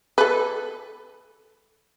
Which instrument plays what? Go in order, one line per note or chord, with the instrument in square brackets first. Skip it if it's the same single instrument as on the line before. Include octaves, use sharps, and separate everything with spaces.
[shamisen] A4 B4